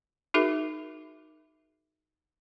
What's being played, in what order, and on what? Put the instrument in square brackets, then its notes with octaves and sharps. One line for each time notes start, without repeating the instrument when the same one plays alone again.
[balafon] D#4 F#4 G#4 A#4 E5